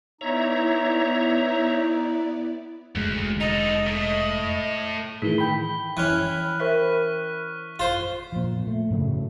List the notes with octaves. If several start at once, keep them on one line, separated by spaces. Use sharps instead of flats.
B3 D#4 E4 C#5 D5 E5 A#5
F1 D2 G#3
D#4 A4 D#5
A2
A2 D#3 E3 G#4 B6 G7
G5 B5
E3 C#4 F6 F#6 D#7
A#4 C5 E5 C#6 F#6 B6
F4 C5 G7
A#2 F3
A3
A2 C#3 F#3 A3